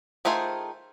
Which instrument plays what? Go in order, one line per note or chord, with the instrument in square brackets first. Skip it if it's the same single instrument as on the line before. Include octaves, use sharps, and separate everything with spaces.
[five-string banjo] D#3 A3 F4 G#4 C5